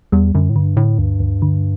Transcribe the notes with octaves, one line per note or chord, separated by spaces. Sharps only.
E2 G3
F#2 D3
A2
G2 D3
A2 D3
D2 G2
D2
D3